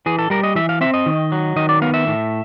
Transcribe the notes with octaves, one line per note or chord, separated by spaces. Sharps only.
E3 G#4
A4
G3 A#4
D#5
E3 E5
F5
C4 E5
D#5
D#3
F#3
D#3 D#5
D5
B3 F5
E5
A2